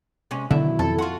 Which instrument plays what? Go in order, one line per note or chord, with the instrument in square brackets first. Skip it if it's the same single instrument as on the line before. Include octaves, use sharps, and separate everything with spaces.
[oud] C3 G#3 C#4
[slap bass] B2 D#3 F#3 [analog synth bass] D3 [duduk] E4 [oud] E5
[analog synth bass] F2 [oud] A4
[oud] F4 F#4